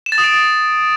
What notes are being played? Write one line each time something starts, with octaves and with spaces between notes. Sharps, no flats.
E7
A6
D#6
D7